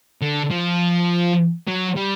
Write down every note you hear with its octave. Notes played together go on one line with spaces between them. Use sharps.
D3
F3
F#3
G3